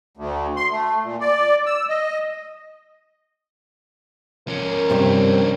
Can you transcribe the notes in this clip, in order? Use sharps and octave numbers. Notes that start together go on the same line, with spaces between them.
D2
C6
A3
A#2
D5
E6
D#5
F3 C#4 A#4
G2 C3 G3 C4